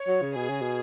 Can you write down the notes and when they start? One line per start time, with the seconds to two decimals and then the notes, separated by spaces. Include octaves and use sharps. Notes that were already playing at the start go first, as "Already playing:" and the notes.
Already playing: C#5
0.08 F#3
0.22 C#3
0.36 B2 G#4
0.49 C#3
0.62 B2